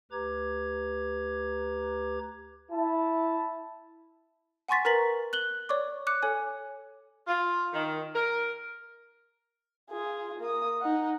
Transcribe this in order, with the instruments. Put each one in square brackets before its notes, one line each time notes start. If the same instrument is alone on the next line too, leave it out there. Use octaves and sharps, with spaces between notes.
[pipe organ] D2 G4 B4 A#5 D6 G#6
[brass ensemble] E4 A5
[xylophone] F#5 G#5 C6 C#6 A6 B6
A#4 B4 A#5 A6 B6 F#7
F#6 F#7 G7
C#5 D5 C#6 D6
D6 F#6 C#7
A4 C#5 G#5
[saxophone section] F4
D#3
A#4
[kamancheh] F4 G#4
A#3 D#6
D#4 F#5